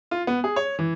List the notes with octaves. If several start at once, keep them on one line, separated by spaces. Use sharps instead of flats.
F4
B3
G#4
C#5
E3